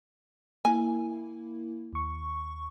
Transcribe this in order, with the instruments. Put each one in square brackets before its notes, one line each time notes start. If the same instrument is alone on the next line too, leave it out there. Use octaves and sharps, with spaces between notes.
[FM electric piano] A#3 E4 [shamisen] G#5
[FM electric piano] D#2 C#6